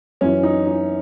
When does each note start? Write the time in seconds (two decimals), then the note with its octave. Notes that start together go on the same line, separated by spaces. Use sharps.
0.21 F#2 E3 C#4
0.43 D#4
0.65 D#4